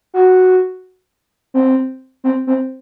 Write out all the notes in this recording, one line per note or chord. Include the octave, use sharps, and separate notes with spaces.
F#4
C4
C4
C4